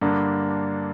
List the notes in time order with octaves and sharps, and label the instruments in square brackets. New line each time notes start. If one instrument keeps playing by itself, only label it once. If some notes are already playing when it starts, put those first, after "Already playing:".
[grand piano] G2 D3 A#3 D4